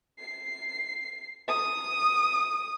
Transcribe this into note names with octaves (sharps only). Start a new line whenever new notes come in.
C7
D#6